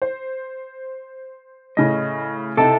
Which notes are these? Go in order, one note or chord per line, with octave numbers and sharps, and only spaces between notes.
C5
A2 C#3 C#4 D#5
C3 D#4 E4 A4 G5 A5